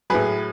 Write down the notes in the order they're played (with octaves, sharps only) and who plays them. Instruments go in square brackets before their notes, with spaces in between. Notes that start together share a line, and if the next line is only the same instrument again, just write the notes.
[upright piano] A2 F#3 G#4 B4